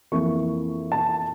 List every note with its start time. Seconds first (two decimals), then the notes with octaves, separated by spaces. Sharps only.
0.12 F2 E3 A#3 E4 C#6
0.92 A5